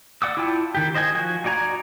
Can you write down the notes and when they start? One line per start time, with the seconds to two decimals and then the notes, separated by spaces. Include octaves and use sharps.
0.22 D5 F#5 D6 E6
0.37 E4 F4 G5 A5
0.75 D#3 G4
0.94 C5 D#5 E5 G#5
1.15 F3 F#4 G#5
1.44 D#4 F#4 D5 G#5 A#5